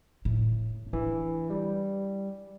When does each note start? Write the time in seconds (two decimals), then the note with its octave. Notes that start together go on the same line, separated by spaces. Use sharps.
0.25 A2
0.93 E3 D4
1.50 G3